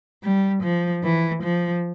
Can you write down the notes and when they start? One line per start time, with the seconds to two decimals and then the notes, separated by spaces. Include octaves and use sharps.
0.24 G3
0.63 F3
1.04 E3
1.44 F3